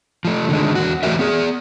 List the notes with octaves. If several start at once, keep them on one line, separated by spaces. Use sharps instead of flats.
F3 A3
D3 D#3 G#3
E2 F#4
E3 A3 F#4 G4 A#4 E5
B3 G#4